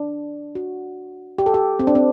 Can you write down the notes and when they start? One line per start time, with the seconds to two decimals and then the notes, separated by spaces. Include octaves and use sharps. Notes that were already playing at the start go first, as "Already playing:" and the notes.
Already playing: D4
0.55 F#4
1.38 G4
1.46 A4
1.54 G4
1.79 C4
1.87 D4
1.95 C4